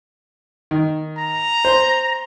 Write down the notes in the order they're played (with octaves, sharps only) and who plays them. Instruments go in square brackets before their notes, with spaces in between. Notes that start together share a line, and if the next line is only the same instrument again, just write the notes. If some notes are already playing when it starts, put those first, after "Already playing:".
[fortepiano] D#3
[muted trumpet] A#5
[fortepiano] C5